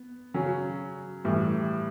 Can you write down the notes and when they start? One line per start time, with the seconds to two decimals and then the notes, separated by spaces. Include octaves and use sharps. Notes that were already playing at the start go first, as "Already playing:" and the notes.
Already playing: B3
0.34 C#3 F#3 C#4
1.24 A2 E3 G3